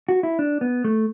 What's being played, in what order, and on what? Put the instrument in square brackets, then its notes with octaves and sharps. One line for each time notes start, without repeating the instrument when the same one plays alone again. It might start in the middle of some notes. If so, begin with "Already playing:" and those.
[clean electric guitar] F#4
E4
D4
B3
A3